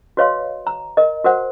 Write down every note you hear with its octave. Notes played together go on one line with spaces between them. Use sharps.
F#4 B4 C#5 D#5 F5 C6
A#5
A#4 D#5
F#4 A#4 C5 F#5